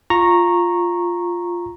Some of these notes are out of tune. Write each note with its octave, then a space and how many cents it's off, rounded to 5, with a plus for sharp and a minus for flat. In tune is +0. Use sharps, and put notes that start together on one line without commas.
F4 +0 A#5 +0 C#6 -15